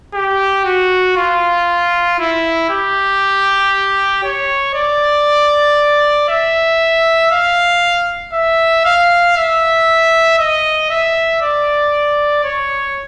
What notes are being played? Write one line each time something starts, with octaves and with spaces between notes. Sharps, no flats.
G4
F#4
F4
E4
G4
C#5
D5
E5
F5
E5
F5
E5
D#5
E5
D5
C#5